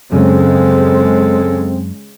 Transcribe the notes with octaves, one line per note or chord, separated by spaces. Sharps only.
F#2 C#3 G#3 C4 A4